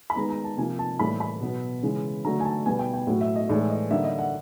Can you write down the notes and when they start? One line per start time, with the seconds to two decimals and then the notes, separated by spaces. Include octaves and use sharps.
0.10 B5
0.16 D#3 G#3 B3 A#5
0.30 A#5
0.44 A5
0.58 C3 F3 A#3 G#5
0.79 A5
0.99 A2 E3 G3 A#3 B5
1.20 B5
1.41 B2 F#3 B3
1.83 C#3 E3 G#3
2.24 D3 F#3 A3 A#5
2.40 G#5
2.45 A5
2.66 B2 G3 B3 G#5
2.79 G5
2.94 G5
3.07 A2 F#3 A3 F#5
3.21 E5
3.36 D#5
3.49 A2 E3 G#3 D5
3.70 D#5
3.91 D3 G3 A#3 E5
4.04 D#5
4.19 F#5